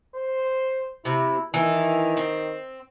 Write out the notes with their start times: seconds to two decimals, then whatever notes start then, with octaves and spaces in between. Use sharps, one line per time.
0.15 C5
1.05 C3 E4
1.54 D#3 E3
2.17 C4